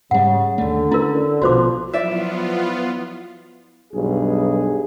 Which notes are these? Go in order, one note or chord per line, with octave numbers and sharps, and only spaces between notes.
G#2 C#3 G3 F#5
D#2 D3 A3
C#4 E4 A#4
A#1 B2 F3 F#4 C5 D6
F3 F#3 B3 E4 F4 D5 E5
B1 G2 G#4